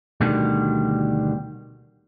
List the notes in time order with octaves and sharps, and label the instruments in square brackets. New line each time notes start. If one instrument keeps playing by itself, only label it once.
[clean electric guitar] D2 B2 D3 D#3 G3